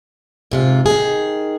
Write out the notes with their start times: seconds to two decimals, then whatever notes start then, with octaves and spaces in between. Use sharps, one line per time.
0.51 G#2 C3 F4
0.86 D#3 G#4